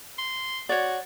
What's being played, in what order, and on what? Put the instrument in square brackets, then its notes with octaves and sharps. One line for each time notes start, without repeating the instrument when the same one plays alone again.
[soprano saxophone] C6
[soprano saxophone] F#4 [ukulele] C#5 D5